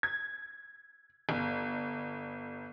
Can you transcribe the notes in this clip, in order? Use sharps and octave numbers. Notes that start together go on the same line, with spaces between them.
G#6
G1